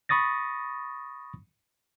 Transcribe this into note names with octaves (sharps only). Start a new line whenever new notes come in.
B5 C#6 D#6 A6 A#6